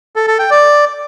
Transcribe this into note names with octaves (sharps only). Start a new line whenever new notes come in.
A4
A4
G5
D5